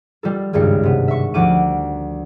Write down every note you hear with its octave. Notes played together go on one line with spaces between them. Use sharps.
G3 F4 A4
G#1 C#2 G2 G3 C#7
C3 B3
E5 C#6
D2 F3 G3 F#5 D6 D#7